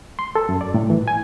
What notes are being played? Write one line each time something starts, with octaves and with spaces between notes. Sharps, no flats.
C6
A4
F#2
D5
A2
E3
G#5